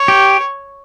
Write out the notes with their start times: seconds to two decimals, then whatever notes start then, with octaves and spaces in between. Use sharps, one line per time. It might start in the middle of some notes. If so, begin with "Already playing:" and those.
Already playing: C#5
0.08 G4